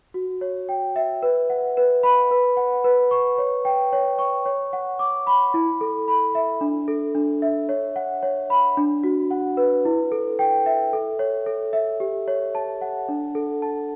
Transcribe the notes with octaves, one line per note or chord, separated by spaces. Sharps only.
F#4
C#5
G5
E5
B4
F#5
B4
B5
B4
F#5
B4
C#6
C#5
G5
C#5
C#6
C#5
F#5
D6
B5
E4
A4
B5
E5
D4
A4
D4
E5
C#5
F#5
C#5
B5
D4
F#4
F#5
B4
E4
A4
G5
E5
A4
C#5
A4
E5
G4
C#5
A5
F#5
D4
A4
A5